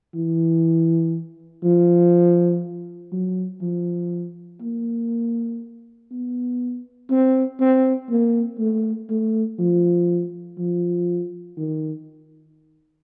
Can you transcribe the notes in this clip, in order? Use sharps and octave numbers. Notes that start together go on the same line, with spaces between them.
E3
F3
F#3
F3
A#3
B3
C4
C4
A#3
A3
A3
F3
F3
D#3